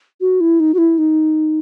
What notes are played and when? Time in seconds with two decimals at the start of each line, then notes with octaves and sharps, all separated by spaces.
0.21 F#4
0.40 E4
0.60 D#4
0.74 F#4
0.78 E4
0.98 D#4